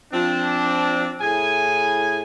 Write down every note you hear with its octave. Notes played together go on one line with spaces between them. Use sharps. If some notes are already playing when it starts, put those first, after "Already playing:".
F3 C4 D4
A2 E4 G#4 G#5